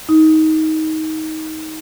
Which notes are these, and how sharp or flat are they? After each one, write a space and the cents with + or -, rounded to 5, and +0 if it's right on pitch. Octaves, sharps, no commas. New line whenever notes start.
D#4 +20